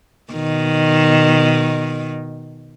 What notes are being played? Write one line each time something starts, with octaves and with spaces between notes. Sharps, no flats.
B2 D#3